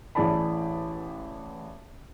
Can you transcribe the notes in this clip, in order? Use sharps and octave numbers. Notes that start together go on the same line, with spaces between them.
A1 E3 G#4 D5 A5 B5